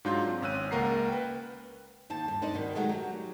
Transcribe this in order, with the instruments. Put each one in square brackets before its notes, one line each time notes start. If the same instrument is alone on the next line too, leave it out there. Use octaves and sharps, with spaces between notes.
[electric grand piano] G#2 F#3 D4 F4 C6 G6
C4
G#1 C#4 E6 F#6 D#7
C#2 A#3 A#4 F#5 A#5 C7
B4 G5
[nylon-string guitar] D#2 C5 A5
G2
D4 D#4 C5 D5
B2 D#3 G3
D#3 F#3 G#3 A3 F#5
F#3 G4